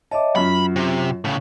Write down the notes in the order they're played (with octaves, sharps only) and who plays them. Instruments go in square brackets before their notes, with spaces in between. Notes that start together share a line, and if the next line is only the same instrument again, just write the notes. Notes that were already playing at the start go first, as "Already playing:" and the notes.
[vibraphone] C#5 D#5 E5 [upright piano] A5 D6
[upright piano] F#2 [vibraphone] F#3 F4 [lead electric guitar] B5
[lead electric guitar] C3
A2 C#3